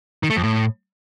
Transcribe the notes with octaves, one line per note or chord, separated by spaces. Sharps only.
D#3
A3
F2
A2